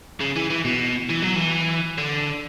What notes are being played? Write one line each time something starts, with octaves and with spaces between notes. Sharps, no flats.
C#3
E3
E3
B2
E3
F#3
E3
D3